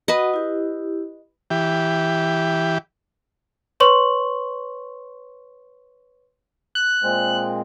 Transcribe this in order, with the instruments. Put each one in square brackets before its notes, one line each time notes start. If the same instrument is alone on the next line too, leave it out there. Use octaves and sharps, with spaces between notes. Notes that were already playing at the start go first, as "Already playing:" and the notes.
[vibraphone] F#4 F#5 B5 [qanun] B4 D#5
[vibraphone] E4 G4
[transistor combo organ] E3 G4
[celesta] B4 C#5 C6 C#6 F#7
[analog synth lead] F#6
[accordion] A#2 G#3 C4